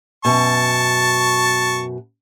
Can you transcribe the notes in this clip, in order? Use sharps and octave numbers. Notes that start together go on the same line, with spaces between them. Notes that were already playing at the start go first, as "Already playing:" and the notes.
F#2 B2 A5 C#6